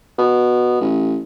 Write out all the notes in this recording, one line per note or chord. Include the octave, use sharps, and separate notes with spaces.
B2
A1